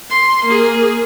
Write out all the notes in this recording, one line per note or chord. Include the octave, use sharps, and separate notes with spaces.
C6
A#3 G#4